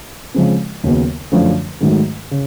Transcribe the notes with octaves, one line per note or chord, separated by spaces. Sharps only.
C#3 F3 G#3 C4
D#2 C#3 F#3 B3
F#2 D3 F3 A3 C#4
G#2 D#3 F#3 A3
C#3